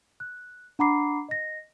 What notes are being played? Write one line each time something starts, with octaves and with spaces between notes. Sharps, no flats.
F#6
D4 F#5 A#5 B5 D6 C7
D#5 A#6